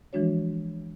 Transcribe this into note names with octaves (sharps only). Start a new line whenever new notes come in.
E3 F3 G#3 D4 F#4 C#5